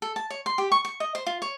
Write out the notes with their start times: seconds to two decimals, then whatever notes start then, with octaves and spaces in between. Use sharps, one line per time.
0.02 A4
0.16 A5
0.30 C#5
0.46 C6
0.58 G4
0.72 C#6
0.85 C#6
1.00 D#5
1.15 C5
1.26 F4
1.42 C#5